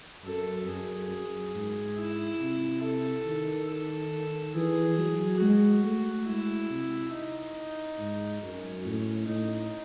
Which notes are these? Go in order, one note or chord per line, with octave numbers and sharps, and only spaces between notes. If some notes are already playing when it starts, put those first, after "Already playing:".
F#2 A4
F#2 G#4
F#2
G#2
E4
C3
A4
D#3
A4
E3 G#4
F#3
G#3 F#4
A3
G#3 E4
C3
D#4
G#2
F#2 C#4
A2
A2 D#4